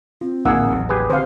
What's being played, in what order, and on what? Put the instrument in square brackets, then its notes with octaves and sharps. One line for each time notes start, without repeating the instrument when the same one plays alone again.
[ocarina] C4 [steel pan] F4
[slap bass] D1 A#1 [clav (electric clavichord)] A#3 G#4 [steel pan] D#4 F#5 E6
[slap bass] A1 D#2 F#3
[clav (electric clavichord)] G4 G#4 B4
[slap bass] D3 [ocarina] C4 [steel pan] C5 F5